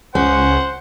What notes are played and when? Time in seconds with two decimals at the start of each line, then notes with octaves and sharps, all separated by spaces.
0.15 C#2 C#4 C5 F#5